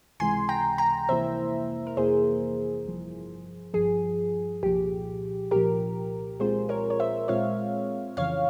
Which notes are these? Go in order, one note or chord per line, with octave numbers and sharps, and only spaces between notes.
C#2 C3 E3 G#3 G#5 C6
G5 A#5
G5 A#5
F2 C3 E3 A#3 E4 C5 E5
A#4
F2 C3 E3 A#3 E4 G#4 C5
G1 G2 F3
G1 G2 F3 G#4
C2 A#2 F3 G4
C2 A#2 F3 G4 A#4
A#2 G#3 C4 F4 G#4 C5
A#4 C#5
C#5
C5 E5
A#2 G#3 C4 F4 C#5 F5
F2 C#3 E3 C#5 F5